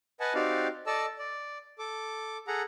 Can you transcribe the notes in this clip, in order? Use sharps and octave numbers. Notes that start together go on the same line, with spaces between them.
B4 D#5 F#5 G#5 A5
C4 D#4 F#4 G4 D5 F5
A4 D5 D#5 A5 E6
D5
A4 D6
G#4 A4 F#5 A#5